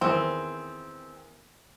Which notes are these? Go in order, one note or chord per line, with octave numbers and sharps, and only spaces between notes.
E2 D#3 C4 E6